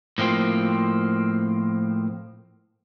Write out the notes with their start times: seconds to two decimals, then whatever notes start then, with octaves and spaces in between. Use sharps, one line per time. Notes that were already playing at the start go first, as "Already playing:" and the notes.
0.18 A2 F3 A#3 C4